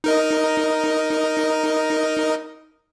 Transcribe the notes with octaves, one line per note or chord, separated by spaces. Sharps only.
D#4 A#4 D#5